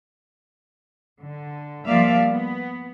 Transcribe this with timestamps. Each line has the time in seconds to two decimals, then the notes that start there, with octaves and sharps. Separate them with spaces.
1.21 D3
1.86 F3 G3 A#3 D5 E5 F5
2.30 B3